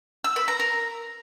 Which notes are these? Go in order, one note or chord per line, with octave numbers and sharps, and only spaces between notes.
E6
B4
A#5
A#4